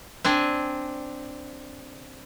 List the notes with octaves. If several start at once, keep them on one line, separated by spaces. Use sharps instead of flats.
C4 D4 G#5